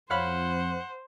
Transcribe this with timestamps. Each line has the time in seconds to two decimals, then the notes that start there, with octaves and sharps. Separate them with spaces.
0.10 F2 C5 C#5 F5 F#5 B5